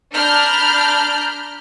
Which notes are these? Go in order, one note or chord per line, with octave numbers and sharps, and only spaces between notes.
D4 A#5 B5 F6 G6